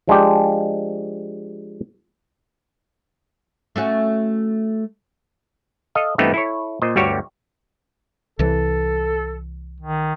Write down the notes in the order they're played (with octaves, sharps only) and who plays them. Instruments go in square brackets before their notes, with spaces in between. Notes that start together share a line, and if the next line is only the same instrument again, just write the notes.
[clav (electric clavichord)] F3 G#3 D4 G4
[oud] A3 C#4 F#4
[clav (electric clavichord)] A4 D#5 F5
G2 E3 A3 B3 C4 D#4
E4 A4 C#5
A#2 C5 D#5
G1 D2 G3 F#4 G4 C#5
[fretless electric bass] C2 E3 [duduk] A4
[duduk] D#3